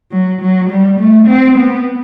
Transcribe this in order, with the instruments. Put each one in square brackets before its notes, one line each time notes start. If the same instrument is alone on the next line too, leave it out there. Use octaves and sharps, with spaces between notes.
[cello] F#3
F#3
G3
A3
C4
B3